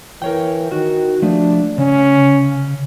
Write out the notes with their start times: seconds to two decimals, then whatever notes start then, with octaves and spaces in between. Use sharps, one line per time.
0.22 E3 A#4 C#5 G5
0.71 D#3 F#4
1.22 F3 A3 D4
1.78 C#3 C#4